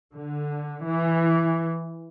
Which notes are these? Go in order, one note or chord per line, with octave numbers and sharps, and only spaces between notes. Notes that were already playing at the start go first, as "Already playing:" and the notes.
D3
E3